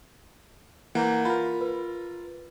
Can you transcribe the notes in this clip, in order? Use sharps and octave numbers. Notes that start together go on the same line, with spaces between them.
E3 A#3 F#5 A#5 G6
F4 A#4 B5
B4